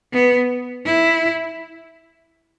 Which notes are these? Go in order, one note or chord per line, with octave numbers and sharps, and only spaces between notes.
B3
E4